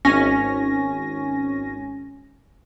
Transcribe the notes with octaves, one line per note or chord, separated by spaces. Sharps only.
G#1 C#4 G#5 A#6